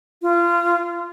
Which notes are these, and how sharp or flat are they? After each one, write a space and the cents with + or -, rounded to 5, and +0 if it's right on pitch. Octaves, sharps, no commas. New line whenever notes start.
F4 -25